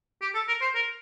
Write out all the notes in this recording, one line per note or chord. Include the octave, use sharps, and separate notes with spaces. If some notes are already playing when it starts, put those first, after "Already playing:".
G4
A4
A#4
C5
A#4